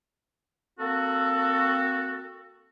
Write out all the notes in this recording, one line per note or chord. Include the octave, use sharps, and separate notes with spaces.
A#3 C4 F#4 A4